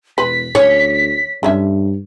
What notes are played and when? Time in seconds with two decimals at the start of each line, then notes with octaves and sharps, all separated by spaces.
0.18 E1 B4 B6
0.55 D2 C#4 C#5
1.43 G2 D3 C#4 E5